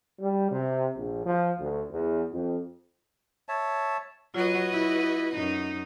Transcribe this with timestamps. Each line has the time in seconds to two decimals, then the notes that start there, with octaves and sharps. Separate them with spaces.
0.20 G3
0.51 C3
0.96 A#1
1.26 F3
1.59 D2
1.91 E2
2.32 F2
3.49 C#5 E5 A5
4.34 F#3 F4 F#4 B4 D#5
4.72 E4
5.34 F#2 D#4